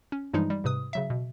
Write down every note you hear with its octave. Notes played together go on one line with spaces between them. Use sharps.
C#4
G2 E3 F3 G3 G#3 D#4
G3
G#2 C3 B4 D#6
C#3 F#3 E5
B2